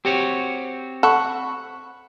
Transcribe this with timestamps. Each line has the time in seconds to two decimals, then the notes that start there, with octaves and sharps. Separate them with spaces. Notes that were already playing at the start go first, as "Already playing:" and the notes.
0.05 C4 F#4 G4 C#5
1.03 A4 F#5 B5 C#6